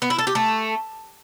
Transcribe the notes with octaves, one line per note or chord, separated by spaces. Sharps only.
B3
E4
A4
G4
A3